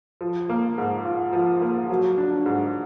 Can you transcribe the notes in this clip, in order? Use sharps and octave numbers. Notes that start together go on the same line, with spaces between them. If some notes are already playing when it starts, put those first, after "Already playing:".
F3
A#3
G#2
F4
F3
A#3
F#3
D4
G#2